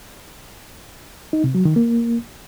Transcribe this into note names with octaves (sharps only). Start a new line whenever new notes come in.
D#4
C3
F#3
D#3
A#3